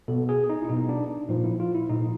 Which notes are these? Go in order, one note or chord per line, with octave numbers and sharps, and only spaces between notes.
B2 A4
G#4
D#4
E4
B2 D#4
D4
A#2 F3 D#4
E4
F4
E4
A#2 F3 D#4